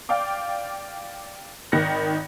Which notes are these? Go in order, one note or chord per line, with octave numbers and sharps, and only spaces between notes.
D5 F5 G5 D6
G#1 D#3 B5 F#6 A#6 C#7